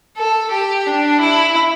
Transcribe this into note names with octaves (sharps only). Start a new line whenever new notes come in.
A4
G4
D4
E4